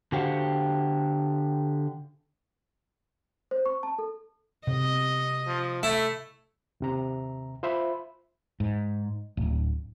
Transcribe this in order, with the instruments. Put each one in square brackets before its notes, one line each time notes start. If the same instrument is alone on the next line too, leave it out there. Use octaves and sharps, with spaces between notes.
[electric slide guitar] D3 F#4 G4 C5 F5 F#5
[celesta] C5
C#6
A5
A4
[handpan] C3 [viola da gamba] D#5
[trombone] F3
[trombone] A3 [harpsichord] E4
[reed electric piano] D#2 C3 A#5
F4 C5 E5 B5
[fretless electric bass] G#2
D1